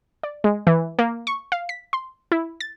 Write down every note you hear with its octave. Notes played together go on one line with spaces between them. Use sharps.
D5
G#3
E3
A#3
C#6
F5
B6
C6
E4
A6